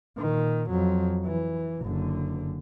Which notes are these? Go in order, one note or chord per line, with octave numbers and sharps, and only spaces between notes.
A#2 D#3
F2 F#3
E3
F#1 D3